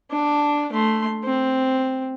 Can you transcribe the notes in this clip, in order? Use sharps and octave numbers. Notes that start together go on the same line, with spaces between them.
D4
A3 C6
C4